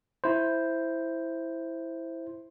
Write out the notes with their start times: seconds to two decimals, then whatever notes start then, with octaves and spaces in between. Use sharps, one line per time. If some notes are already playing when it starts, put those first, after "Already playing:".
0.24 E4 C5